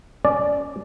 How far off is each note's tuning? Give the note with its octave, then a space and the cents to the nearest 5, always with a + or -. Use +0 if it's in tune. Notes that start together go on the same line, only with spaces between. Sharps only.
C#4 +25 D5 +0